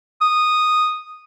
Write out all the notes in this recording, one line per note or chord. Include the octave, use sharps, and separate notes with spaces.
D#6